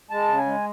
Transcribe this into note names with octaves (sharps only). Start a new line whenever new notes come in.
G#3 A5
C#3
G#5
G#3